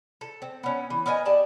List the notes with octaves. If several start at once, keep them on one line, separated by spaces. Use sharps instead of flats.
A4
C4
B3 C#4
E3
B3 A#4 D#5 G#5
G4 D5 A5